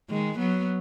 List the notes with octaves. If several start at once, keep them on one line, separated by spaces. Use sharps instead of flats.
D#3 G#3
F#3 B3